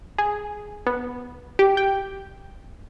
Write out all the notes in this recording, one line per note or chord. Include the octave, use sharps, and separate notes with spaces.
G#4
B3
G4
G5